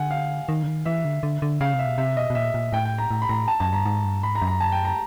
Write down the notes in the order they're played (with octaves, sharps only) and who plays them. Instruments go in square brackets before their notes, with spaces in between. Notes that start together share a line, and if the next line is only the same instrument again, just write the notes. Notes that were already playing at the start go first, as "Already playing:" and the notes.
Already playing: [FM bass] D3 [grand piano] F#5 G#5
[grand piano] F5
[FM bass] D#3
D3
D#3
[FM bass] E3 [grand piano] E5
[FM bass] D3
D3
D3
[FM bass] C#3 [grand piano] F5
[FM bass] C3
[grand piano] E5
[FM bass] B2
[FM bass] C3 [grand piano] E5
[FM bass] B2 [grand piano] D#5
[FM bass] B2
[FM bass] A#2 [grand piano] E5
[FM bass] A#2
[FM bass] A2 [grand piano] G5
[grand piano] G5
A#5
[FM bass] A2
[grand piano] B5
[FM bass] A2 [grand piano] A#5
[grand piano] A5
[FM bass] F#2 [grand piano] A5
[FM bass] G2 [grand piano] A#5
[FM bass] G#2
G2
[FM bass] G#2 [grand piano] B5
[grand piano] A#5
[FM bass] F#2
[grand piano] A#5
A5
G5
A#5